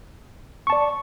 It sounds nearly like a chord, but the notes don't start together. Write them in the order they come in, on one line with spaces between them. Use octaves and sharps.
C#6 A5 D5